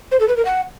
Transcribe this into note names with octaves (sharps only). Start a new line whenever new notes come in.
C5
A4
B4
A#4
F#5